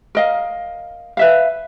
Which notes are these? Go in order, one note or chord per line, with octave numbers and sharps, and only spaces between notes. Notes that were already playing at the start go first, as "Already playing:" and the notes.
A#4 D#5 F5
B4 E5 F5